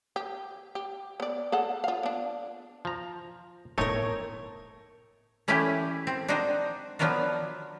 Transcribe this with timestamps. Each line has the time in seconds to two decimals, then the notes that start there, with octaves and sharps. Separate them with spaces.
0.16 G4
0.75 G4
1.20 B3 D5
1.52 G#4 A4 F#5
1.84 F4 F5
2.03 B3 D4
2.85 F3 A#5
3.78 A2 A3 B3 C4 D#4 A#4 C#5
5.48 E3 A3 C#4 E4 G4
6.07 C4
6.28 D4 D#4 F#4 C5
6.99 F3 F#3 B3 D4 F4 F#4